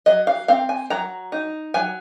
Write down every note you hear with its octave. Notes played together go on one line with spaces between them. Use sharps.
F#3 D#5
F5
C4 F5
G#5
F#3 A#5
D#4
F#3 G#5